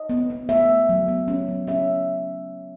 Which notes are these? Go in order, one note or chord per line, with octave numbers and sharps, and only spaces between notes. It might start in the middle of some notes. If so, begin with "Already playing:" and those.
Already playing: D#5
B3
B3
A3 E5
A3
F#3
B3
C#4
F#3
C#4 E5